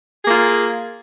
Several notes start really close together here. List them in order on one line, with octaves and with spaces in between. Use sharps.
G#4 A#3 F4